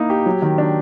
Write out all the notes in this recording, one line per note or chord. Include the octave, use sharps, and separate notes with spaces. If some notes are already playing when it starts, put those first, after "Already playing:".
Already playing: A#3 D#4 E4
G4
F#3
D#3
D4